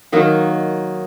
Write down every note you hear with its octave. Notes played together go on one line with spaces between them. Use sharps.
D#3 F#3 A#3 D#4